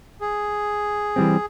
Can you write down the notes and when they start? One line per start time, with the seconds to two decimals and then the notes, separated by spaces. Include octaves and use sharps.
0.21 G#4
1.16 E3 G3 C4